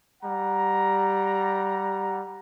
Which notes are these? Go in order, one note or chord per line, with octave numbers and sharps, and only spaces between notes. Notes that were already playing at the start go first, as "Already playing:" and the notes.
G3 F#5 A#5